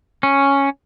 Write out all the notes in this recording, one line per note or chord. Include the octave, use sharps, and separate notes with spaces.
C#4